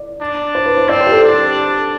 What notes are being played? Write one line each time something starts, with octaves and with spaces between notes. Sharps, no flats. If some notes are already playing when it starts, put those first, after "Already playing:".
Already playing: D5
D4
C5
B4
C5
C4 D5
C5
G4
A4
D4